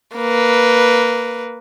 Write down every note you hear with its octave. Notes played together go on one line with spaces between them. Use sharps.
A#3 B4